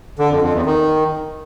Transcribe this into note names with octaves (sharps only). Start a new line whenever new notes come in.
D3
F2
F2
E2
D#3